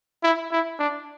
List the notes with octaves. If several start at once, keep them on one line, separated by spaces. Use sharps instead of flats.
E4
E4
D4